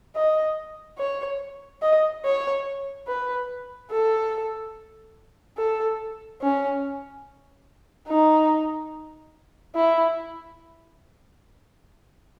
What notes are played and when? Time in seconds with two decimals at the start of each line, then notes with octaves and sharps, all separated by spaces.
0.15 D#5
0.98 C#5
1.82 D#5
2.25 C#5
3.08 B4
3.91 A4
5.57 A4
6.41 C#4
8.08 D#4
9.76 E4